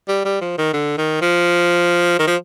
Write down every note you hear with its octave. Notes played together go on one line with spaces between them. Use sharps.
G3
G3
F3
D#3
D3
D#3
F3
D#3
F3